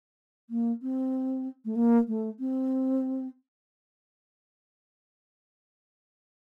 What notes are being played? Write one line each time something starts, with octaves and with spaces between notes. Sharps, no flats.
A#3
C4
A3
A#3
A3
C4